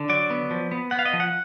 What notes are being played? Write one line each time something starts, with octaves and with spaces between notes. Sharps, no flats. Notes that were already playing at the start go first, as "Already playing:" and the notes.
Already playing: D3
F#3 D5
B3
F3
B3
B3 F#5
F5
D#5
F3
F#5